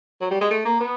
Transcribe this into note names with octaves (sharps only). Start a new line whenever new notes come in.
F#3
G3
G#3
A3
A#3
B3